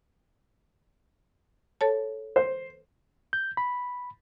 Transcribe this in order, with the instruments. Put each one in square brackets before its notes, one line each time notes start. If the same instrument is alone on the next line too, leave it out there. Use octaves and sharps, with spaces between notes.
[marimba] A4 C#5 A5
[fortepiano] C5
[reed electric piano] G6
B5